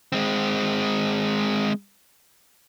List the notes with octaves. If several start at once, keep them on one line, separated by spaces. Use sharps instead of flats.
G#3 C4